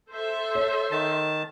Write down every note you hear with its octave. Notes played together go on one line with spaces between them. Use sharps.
A4 C5 E5
C#5
D#3 A5